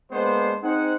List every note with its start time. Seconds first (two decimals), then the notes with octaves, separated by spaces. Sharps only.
0.12 G#3 A#3 B3 D4 C5
0.64 C4 D#4 G#4 C5 F#5